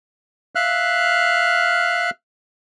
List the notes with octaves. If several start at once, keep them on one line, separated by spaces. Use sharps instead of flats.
E5 F5 F6 F#6